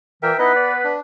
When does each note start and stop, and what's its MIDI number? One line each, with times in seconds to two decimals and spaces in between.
0.23 0.32 46
0.23 0.32 52
0.23 0.37 70
0.23 0.37 76
0.23 0.37 79
0.39 0.92 59
0.39 0.52 63
0.39 0.52 64
0.39 0.92 71
0.39 0.52 75
0.56 0.73 74
0.84 1.00 62